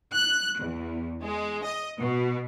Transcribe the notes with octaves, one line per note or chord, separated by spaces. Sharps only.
F#6
E2
G#3
D#5
B2